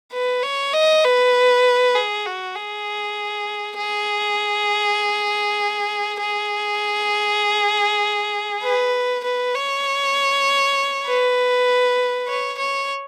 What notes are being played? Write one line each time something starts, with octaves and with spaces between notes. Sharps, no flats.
B4
C#5
D#5
B4
G#4
F#4
G#4
G#4
G#4
B4
B4
C#5
B4
C#5
C#5